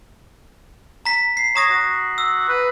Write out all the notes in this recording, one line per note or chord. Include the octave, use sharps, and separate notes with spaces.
A#5 B6
C7
C#5 A#5 D#6 A#6
F#4
E6
B4